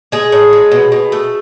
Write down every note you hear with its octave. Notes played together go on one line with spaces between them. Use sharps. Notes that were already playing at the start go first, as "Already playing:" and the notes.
G#3 G#4
A2
G#3
B2
B2
A3